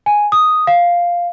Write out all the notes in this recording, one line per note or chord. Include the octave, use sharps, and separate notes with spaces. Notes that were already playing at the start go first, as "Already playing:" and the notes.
G#5
D#6
F5